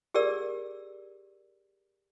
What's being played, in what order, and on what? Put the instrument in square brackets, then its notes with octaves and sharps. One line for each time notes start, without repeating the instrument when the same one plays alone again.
[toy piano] G4 G#4 A#4 D5 E6